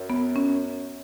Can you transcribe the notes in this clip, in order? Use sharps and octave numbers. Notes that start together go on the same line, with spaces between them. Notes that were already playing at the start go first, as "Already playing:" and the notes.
Already playing: F#2
B3
C#4